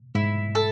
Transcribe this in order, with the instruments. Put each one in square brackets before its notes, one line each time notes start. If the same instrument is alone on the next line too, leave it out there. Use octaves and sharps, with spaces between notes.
[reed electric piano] G#2 [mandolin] E4
[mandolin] A4